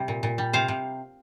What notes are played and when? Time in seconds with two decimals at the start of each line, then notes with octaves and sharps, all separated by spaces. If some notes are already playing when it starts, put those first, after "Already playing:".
Already playing: C3 G3
0.08 A#2
0.23 A#2
0.38 G3
0.53 C3 C5 F5
0.68 C3